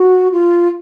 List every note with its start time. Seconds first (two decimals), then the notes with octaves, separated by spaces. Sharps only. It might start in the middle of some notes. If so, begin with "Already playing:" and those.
Already playing: F#4
0.32 F4